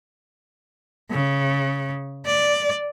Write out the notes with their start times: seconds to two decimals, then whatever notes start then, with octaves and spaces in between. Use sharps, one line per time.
1.11 C#3
2.26 D5